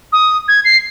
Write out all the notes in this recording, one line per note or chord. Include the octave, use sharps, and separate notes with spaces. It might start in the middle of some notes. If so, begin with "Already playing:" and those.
D#6
G#6
C7